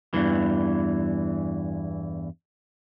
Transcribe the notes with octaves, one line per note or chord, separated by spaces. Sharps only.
E2 G2 E3